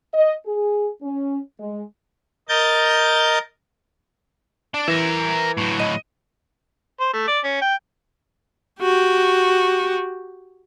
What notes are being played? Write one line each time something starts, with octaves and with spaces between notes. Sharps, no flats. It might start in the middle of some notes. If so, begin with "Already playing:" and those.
D#5
G#4
C#4
G#3
A#4 D#5 G6 A6
D4
E3 A#4 E5
A2 F#3
D#5 D#7
C5
A3
D5
C#4
G5
F#4 G4